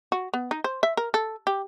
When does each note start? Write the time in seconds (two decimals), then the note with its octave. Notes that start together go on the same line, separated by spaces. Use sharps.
0.12 F#4
0.34 B3
0.51 D#4
0.64 C5
0.83 E5
0.97 A#4
1.14 A4
1.47 G4